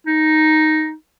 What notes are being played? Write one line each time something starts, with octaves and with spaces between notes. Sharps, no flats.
D#4